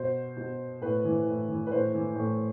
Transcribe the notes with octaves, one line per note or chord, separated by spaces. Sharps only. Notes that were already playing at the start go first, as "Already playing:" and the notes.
Already playing: B2 C5
B2
A2 B4
E3
A2
E3
B4
A2 C5
E3
A2